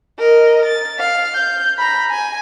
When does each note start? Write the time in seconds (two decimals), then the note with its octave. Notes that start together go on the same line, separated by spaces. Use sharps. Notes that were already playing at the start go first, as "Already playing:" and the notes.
0.19 A#4 D#5
0.65 A6
0.99 F5
1.34 G6
1.78 A#5 B5
2.11 G#5